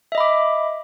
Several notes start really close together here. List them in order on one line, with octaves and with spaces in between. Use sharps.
E5 D#5 B5 D6